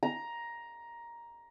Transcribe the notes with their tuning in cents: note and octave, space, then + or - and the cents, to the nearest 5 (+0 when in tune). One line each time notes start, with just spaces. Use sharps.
A#5 +10